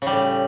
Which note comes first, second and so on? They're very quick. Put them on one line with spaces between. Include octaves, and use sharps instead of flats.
C#3 G3 A2